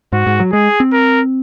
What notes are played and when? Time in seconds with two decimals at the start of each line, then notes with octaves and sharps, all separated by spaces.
0.12 G#2 F#4
0.27 G#2
0.40 F#3
0.52 G#3 G#4
0.80 C4
0.93 A#4